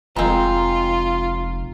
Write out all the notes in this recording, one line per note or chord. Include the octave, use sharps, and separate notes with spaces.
F1 G#3 C4 F4 A#5